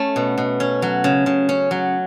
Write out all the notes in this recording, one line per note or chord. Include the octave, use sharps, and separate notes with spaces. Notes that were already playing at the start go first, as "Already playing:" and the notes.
Already playing: A3 C#4
B2
B2
C#4
F#3
C#3
C#3
C#4
F#3